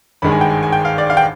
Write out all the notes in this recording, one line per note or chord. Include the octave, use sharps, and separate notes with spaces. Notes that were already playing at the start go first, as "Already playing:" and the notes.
G#1 G2 D#3 G#3 B5
G#5
G5
G#5
G#5
G5
F5
D5
F5
G5